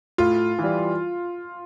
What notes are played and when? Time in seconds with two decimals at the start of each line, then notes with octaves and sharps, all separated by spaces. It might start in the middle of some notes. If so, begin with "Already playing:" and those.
0.18 A2 F4
0.59 E3 G3